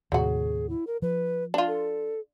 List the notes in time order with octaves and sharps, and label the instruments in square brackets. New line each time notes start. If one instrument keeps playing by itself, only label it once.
[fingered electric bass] D#2 A2 C3 [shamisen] F#3 F#4 [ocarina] G#4
[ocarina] E4
A#4
[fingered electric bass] F3 [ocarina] B4
[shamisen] D4 F4
[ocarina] A4